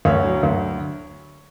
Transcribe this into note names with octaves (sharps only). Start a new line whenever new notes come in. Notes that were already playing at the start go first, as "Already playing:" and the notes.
D2 C#5
F#3
D2